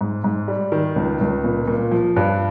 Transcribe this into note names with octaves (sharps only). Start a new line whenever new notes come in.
G#2
G#2
G3
D#3
C#2
C#2
A#2
A#2
F3
G2